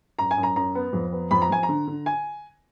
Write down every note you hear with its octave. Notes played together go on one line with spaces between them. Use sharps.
F#2 A#5
G#5
F#2
A#5
F#2 A#5
B3
F2
B3
F2 B5
A#5
F2 G#5
A#5
D3
D3
G#5